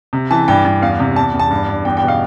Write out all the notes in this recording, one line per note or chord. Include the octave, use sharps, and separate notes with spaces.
C3
E3 A5
G2 G5
G2
E2 F5
C3
E2 A5
E2
A5
G2
G2
E2 G5
G5
B2 F5